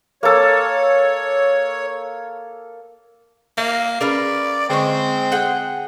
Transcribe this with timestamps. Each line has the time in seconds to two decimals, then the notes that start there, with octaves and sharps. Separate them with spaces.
0.23 A#3 A4 C#5
3.58 A#3 E5
4.01 C#4 G#4 A#4 B4 D5 F5
4.70 D3 G#3 C4 D#5 C#6
5.32 G#4 F#5 G5